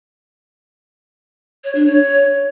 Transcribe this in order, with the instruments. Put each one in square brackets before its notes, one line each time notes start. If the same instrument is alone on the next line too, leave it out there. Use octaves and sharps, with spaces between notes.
[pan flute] C#5
D4
C#5